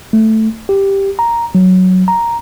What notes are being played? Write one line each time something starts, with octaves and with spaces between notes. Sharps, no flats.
A3
G4
A#5
F#3
A#5